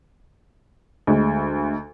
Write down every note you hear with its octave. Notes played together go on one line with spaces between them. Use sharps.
D2 G#3